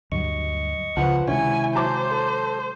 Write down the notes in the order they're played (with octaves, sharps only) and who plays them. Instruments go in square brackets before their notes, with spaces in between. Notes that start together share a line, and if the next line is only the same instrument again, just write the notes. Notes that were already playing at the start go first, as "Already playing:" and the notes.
[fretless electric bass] D2 G2 F#3 [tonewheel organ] D#5 C#6
[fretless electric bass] C#2 C#3 [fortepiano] F3 B4 [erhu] F#5
[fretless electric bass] C3 D#3 G#3 [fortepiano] C#4 [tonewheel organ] E4 [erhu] G#5
[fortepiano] F#3 A5 D6 [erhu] C5
[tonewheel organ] A4